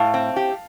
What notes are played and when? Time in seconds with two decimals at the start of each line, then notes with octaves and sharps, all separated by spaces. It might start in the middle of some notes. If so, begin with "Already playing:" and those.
Already playing: A2 F5 A5
0.14 C4
0.36 G4